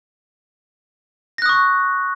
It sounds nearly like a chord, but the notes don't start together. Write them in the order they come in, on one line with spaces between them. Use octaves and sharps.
A#6 F#6 D#6 C#6